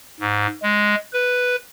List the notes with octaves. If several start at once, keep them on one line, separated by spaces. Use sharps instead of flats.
G#2
G#3
B4